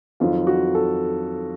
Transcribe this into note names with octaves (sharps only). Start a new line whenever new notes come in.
F2 D#3 F#3 F4
F#4
A4